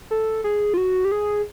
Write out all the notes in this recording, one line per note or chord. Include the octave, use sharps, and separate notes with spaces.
A4
G#4
F4
F#4
G4
G#4